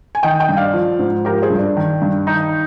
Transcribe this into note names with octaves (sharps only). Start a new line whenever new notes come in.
G#5
D#3 D#5 G5
D#5 G5
G2
D5 F5
F3
G#2
F3 G4 A#4
G#4 C5
G2
D4
D#3
G2
D#3 D#4